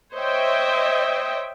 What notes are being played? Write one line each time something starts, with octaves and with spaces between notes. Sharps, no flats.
C5 C#5 D#5 E5 G5